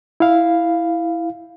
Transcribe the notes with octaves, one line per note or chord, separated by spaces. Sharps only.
E4 F5